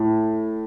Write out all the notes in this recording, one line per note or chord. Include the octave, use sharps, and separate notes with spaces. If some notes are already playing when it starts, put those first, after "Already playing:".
Already playing: A2